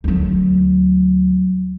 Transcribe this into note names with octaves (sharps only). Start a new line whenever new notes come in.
D2 F#3